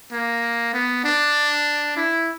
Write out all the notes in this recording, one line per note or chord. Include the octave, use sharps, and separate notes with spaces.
A#3
B3
D4
E4